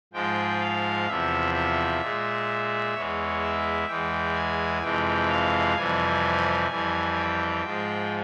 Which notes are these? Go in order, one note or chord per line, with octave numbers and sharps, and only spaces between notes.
G#2 F3 G#3 G5
F5
E2 C3 F3 E5
E5
A#2 G#3
E2 E3 G#3 C#5
E5
E2 E3 G#3 G5
G#5
F2 C3 E3 G#3 G5
F5
F2 C3 E3 G3 G#5
F2 E3 G3
G5
G#2 F3 G#3